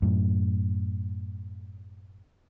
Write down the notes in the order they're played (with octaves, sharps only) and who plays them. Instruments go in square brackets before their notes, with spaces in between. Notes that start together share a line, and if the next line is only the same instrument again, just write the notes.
[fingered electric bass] F#2 A2